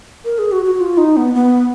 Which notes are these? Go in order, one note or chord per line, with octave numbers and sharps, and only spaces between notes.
A#4
G#4
F#4
F#4
F4
D#4
B3
B3